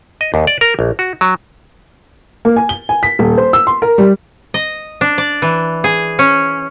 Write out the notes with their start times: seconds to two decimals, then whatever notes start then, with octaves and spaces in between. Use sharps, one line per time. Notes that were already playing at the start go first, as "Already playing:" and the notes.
0.21 D#5
0.34 D#2
0.47 D5
0.61 A#4
0.79 A#1
0.99 F#4
1.21 F#3
2.45 A#3
2.56 G#5
2.69 G7
2.89 G#5
3.03 B6
3.19 D#1
3.37 C5
3.53 E6
3.67 C6
3.82 A#4
3.98 G3
4.54 D#5
5.01 D4
5.18 D5
5.42 E3
5.84 G#4
6.19 C#4